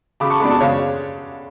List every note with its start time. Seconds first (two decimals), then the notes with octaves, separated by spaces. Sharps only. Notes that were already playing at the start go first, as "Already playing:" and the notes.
0.20 C#3 B5 D6
0.30 A5 C#6
0.40 G#3 B3 D4 B5 D6
0.50 A5 C#6
0.61 C#3 C#5 F5